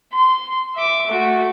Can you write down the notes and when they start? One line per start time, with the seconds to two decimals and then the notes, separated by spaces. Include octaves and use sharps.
0.12 C6
0.75 E5 D6
1.07 A3 F#4